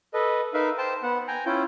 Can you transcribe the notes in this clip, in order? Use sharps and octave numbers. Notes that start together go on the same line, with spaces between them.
A4 B4 D#5
D#4 A#4 B4 E5 F5
C5 G5 A5
B3 F#5
G5 G#5 A#5
C#4 E4 F4 G5